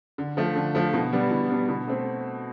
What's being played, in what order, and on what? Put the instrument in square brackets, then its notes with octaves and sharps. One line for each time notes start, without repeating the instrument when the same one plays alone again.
[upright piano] D3
F3 A3
D3
F3 A3
B2
G3 B3 D4
B2
G3 B3 D4
B2
A3 C4